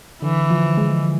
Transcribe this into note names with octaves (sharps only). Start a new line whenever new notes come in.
D3 E3
F3
G#3